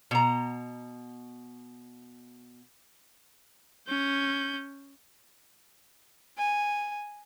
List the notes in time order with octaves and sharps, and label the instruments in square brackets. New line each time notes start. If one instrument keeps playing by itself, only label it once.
[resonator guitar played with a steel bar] B2 A#5
[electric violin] C#4 G6
[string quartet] G#5